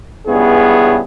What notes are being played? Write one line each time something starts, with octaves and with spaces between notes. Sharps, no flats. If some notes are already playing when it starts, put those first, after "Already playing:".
C#2 G2 B3 C#4 E4 G#4